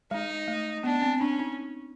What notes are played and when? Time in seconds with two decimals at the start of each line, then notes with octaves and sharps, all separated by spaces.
0.11 G#3 D#4
0.48 A3
0.84 B3 D4
1.02 C4
1.20 C#4 D4
1.39 D#4